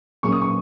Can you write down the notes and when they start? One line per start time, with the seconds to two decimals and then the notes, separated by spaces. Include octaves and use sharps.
0.23 A#2 F#3 A#3 C#4 G#4 C#6
0.32 D#6
0.42 C#6